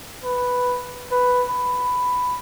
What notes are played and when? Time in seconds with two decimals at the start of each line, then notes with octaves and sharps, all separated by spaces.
0.24 B4
1.11 B4
1.49 B5